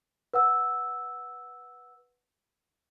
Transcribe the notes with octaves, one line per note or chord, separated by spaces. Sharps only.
B4 F#5 E6